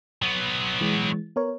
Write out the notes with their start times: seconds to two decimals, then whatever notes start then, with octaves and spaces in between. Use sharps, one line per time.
0.22 F#3 B3
0.81 E3 G#3
1.36 B3 A#4 C#5